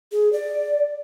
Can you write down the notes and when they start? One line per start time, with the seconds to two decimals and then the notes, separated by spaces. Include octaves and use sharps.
0.12 G#4
0.33 D5